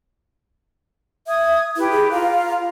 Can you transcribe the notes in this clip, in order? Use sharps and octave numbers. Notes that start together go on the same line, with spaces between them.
E5 D#6 G#6
E4 G4 B4
G#4
F4 F5 A#5